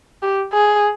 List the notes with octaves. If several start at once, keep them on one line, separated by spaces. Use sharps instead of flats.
G4
G#4